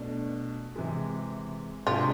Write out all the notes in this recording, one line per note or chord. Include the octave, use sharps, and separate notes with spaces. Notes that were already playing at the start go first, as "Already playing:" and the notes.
Already playing: B2 A3 D4
C3 E3 G#3
C3 G#3 D4 F4 G#4